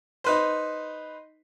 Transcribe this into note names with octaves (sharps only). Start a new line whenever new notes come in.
D#4 B4 C5